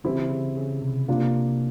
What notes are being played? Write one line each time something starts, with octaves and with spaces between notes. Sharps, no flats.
C#3 E3 G3 C4 E4
C#3
C#3
C3
C3 A#3 D4 F4